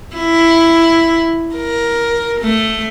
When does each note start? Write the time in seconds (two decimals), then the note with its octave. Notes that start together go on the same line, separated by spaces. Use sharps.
0.16 E4
1.56 A#4
2.41 A3